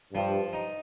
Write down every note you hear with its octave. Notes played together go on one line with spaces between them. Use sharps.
G2 F3
D#4